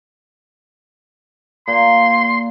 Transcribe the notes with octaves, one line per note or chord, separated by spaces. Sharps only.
A#2 C6